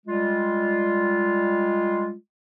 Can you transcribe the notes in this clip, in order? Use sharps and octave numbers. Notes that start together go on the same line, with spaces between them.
G3 G#3 F4